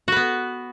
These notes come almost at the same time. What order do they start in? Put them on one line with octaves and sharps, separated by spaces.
F#4 B4 B3